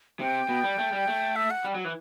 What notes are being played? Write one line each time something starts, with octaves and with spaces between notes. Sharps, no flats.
C3 G5
B2
G3
A3
G3
A3
E5
F#5
G3
F#3
E3